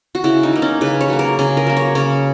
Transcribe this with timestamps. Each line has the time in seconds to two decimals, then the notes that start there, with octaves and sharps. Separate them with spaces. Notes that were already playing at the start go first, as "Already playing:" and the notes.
0.15 F#4
0.24 C#3 E4
0.43 D#4
0.53 F#3 A#3
0.62 C#4
0.81 C#3 B4
1.01 C#5
1.10 F#3 A#3
1.19 A#4
1.39 C#3 G#4
1.57 A#4
1.67 F#3 A#3
1.77 C#5
1.95 C#3 C#5